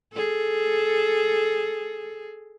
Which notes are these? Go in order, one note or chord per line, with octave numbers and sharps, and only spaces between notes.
G#4 A4